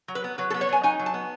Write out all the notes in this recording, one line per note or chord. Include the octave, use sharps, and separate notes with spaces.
F#3
B4
B3
F#3 B4
A4
B3
C#5
F#3 G#5
D#4 G#5
F#3
A5
B3